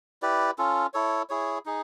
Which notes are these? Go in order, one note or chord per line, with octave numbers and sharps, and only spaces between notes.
E4 G4 B4 D5
C#4 F4 A4
E4 A4 C#5
E4 G#4 C#5
D#4 G#4